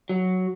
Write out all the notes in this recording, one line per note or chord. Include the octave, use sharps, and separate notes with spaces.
F#3